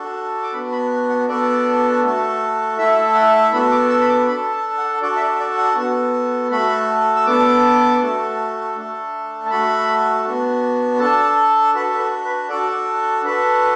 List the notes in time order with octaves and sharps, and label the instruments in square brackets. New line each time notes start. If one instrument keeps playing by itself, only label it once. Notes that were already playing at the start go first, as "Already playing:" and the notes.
Already playing: [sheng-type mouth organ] D4 F#4 A4
D6
B3 D4 F#4 B5
B5
F#5
B3 D4 F#4 A4 D5
A3 F#4 A4
A3 E4 A4 E5
F#5
B3 D4 F#4 A4 B5
D6
E6
B5
D6
D4 A4 B5
A5
F#5
D4 F#4 A4 D5
E5
D5
D5
F#5
B3 F#4 A4
A3 F#4 A4 B5
E6
B3 D4 A4 D6
A3 F#4 A4
A3 D4 A4
A5
A3 F#4 A4 B5
B3 D4 F#4
D4 A4 A5
D4 F#4 A4 B4
B4
A4
B4
D4 F#4 A4 D5
D4 F#4 A4 B4